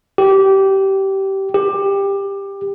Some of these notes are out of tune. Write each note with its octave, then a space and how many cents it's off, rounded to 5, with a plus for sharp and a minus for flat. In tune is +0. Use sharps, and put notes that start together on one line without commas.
G4 -20
G4 +15